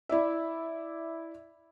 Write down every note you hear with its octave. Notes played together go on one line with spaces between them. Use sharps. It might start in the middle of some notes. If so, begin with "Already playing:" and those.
E4 D5 E5